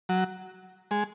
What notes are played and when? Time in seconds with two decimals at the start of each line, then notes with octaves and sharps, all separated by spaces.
0.09 F#3
0.91 G#3